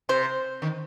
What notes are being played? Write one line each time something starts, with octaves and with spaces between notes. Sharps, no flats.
C3 C5
D#3